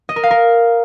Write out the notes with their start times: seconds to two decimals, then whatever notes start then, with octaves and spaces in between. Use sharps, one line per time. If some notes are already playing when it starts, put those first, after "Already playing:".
0.09 D#5
0.16 A#4
0.23 F5
0.31 A#4